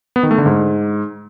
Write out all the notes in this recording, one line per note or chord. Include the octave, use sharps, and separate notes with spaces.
B3
D#3
A3
D3
G#2